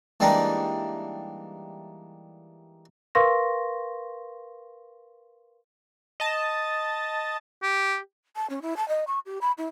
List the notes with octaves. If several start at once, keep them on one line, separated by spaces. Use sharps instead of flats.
E3 G3 G#3 A#3 D4 D#4
A#4 B4 F5 C6 C#6 A#6
D#5 A5
G4
A5
C#4
E4
A5
D#5
C#6
G4
B5
E4